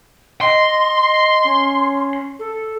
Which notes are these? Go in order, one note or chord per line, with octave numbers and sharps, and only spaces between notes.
D#5 C6
C#4
A4